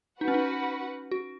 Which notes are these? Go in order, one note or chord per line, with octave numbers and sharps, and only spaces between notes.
D#4 F#4 B4 F#5
C#4
D#4
F#4